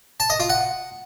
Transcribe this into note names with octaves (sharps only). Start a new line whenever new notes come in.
A5
D#5
F4
F#5